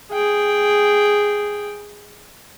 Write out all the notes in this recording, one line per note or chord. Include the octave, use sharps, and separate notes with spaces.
G#4 G5